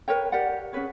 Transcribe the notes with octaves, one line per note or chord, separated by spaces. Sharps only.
A#4 B4 C#5 G5
G4 A#4 D5 F#5
C#4 G#4 B4 C#5